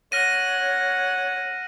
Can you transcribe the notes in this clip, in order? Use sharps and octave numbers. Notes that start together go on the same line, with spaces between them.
C#5 F#5 F6 A#6 D#7